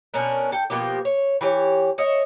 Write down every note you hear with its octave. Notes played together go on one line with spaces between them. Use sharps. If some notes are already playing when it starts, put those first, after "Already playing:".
B2 C#4 D4 A#4
A4 G5
B2 F3 A#3 G4
C#5
E3 G4 G#4 C#5
C#5 D#5 E5